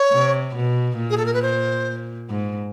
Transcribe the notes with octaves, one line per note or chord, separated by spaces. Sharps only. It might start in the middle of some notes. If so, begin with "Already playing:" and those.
Already playing: C#5
C3
B2
A#2
G#4
A4
A#4
B4
C5
G#2